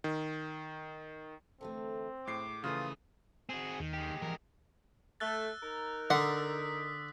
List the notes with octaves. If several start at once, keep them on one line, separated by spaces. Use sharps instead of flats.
D#3
D3 E3 A3 C4
A2 G#3 D6 C7
C#3 E3 F3 A3 F4 A#4 B4 D#6
C4 F#4 G#4
D#2 D#3
G#3 G4
E3 F3 A#4
A3 E6 F#6 A6
D#4 A#4
D3 F#5 C6 D#6 B6